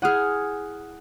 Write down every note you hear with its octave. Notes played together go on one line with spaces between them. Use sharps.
E4 G#4 F#5 D#6 F6